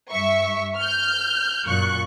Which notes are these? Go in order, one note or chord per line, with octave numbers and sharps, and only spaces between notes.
G2 E5 C#6
F6 G6
F#2 A#2 C#6 F#6